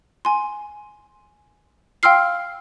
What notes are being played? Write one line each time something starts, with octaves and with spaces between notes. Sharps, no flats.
G#5 C6
F5 G5 C6 E6 F6 C7